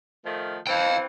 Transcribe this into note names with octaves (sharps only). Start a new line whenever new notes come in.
D#3 F3 A3
E3 C4 C5 F5 G5